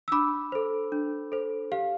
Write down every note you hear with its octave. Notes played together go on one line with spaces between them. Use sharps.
E6
D4 B5 D6
A4 C5
D4
A4 C5
G4 F5